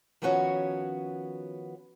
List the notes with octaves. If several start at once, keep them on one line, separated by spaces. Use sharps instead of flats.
D#3 F3 B3 C#4 F#4 C#5